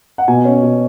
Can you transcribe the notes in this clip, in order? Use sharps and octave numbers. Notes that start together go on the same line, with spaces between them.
F#5
B2 G#5
C#4
B2